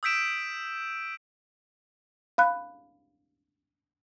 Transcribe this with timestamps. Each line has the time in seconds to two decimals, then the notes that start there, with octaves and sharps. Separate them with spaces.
0.03 D#6 E6 G6 B6 D7 E7
2.38 F5 B5 F#6